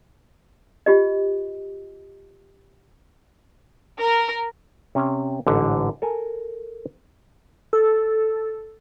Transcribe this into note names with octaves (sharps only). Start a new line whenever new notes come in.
F4 G4 D#5
A#4
C3 C#4
A1 G#2 D3
A4 A#4 G#5
A4